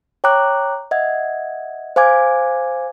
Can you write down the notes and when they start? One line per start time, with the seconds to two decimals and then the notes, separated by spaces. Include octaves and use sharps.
0.24 C#5 G5 A#5 D6 F#6
0.91 D#5 E5 F#5 G#6
1.96 C5 F5 G#5 D6 G#6